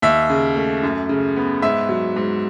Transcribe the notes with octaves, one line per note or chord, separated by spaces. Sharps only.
D#2 E5
C#3
A3
F#2
C#3
B3
G#2 E5
F#3
G#2